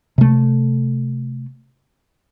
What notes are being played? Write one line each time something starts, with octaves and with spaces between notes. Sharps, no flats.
C3 A3